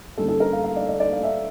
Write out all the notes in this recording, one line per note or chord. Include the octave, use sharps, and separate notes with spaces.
D3 G3 A#3 C#4 A4
A4
A#4
F5
F5
D5
D5
D5
F5
E5